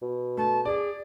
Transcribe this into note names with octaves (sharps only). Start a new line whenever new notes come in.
B2
A3 A5
G#4 D5